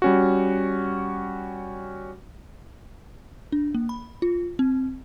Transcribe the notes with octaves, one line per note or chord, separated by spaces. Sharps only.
G3 C#4 F#4
D4
A#3
B5
F4
C4